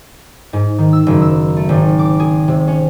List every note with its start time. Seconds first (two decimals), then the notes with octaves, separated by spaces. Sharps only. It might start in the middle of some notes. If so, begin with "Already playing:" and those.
0.53 G#2
0.78 D#3
0.93 E6
1.06 F#1
1.22 E6
1.56 A3
1.69 G#1
1.99 D6
2.20 G#4
2.48 C3
2.68 C#4